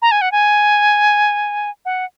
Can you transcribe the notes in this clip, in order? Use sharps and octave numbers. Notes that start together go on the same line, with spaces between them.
A#5
G#5
F#5
G#5
F#5